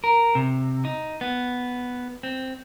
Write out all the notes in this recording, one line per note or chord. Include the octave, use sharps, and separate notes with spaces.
A#4
C3
D#4
B3
C4